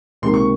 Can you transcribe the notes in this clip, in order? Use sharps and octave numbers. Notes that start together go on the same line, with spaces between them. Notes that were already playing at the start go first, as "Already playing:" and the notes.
C#2 C3 D#3 A#3 C6
C#6